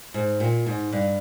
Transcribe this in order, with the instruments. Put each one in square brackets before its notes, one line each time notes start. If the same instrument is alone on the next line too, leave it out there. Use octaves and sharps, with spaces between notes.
[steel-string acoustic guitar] G#2
A#2
G#2
G2